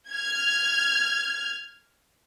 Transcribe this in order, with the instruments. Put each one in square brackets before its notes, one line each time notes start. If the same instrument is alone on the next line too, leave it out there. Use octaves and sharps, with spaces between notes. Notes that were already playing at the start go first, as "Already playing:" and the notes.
[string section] F6 G#6